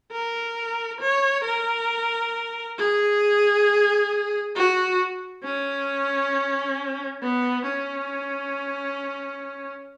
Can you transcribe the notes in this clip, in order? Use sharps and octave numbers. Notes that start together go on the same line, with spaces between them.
A#4
C#5
A#4
G#4
F#4
C#4
B3
C#4